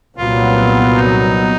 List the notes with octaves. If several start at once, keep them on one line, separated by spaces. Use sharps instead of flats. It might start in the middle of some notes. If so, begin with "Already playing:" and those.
C2 A#2 F#3 B3 F4
D#4